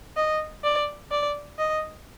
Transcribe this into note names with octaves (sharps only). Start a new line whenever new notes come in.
D#5
D5
D5
D#5